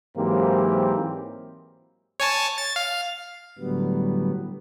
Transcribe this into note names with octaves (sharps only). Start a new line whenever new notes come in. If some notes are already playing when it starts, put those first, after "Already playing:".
G#2 E3 F#3 A#3 C4 G4
C#5 G#5 A5
A6
F5
A2 D3 F#3 G3 B3